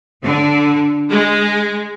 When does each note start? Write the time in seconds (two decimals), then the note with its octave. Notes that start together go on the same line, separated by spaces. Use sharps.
0.24 D3
1.10 G#3